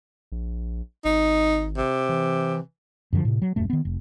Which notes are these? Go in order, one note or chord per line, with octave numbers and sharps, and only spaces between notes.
A#1
G#1 D#4
C3
E3
F#2 D3 D#3 F3
A2 C3
F#3
D#1 F#2 A3
D#3 B3
F1